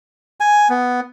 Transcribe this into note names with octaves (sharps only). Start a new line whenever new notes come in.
G#5
B3